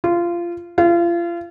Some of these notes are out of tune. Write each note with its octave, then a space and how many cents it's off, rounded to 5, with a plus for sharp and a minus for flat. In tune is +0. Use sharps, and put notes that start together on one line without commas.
F4 -20
F4 -35